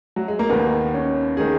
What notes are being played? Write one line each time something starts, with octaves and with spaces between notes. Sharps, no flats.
F#3
G#3
A#3
D#2 D#3 B3
C#4
D#3 G#4